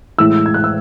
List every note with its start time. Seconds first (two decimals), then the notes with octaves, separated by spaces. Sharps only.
0.18 A2 E3 G#3 E6
0.46 G#6
0.54 F#6
0.64 E6